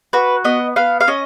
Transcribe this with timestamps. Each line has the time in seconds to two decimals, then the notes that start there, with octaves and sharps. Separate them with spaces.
0.13 F#4 B4
0.45 B3 D#5
0.76 B3 F5
1.01 F5
1.08 C#4 D#5